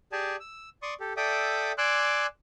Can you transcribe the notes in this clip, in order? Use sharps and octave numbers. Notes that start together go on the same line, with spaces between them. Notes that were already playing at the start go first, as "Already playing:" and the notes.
G4 G#4 D5 G#5 A5
E6
D5 C6 C#6 D#6
G4 A4
A4 D5 E5 G5 D6 D#6
D5 G#5 C6 D6 E6 F#6